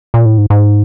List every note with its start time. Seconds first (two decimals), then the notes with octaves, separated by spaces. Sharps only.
0.14 A#2
0.25 A2
0.38 G#2
0.50 G#2